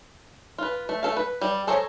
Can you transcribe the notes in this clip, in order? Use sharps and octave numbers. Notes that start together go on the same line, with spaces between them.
F4 B4
A3
A3 A4 F5
B4
G3
G#4 A4 C5 C#5 A#5